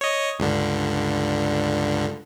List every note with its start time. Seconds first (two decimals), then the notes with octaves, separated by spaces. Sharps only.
0.01 C#5 D#5
0.39 C#2 G2 D3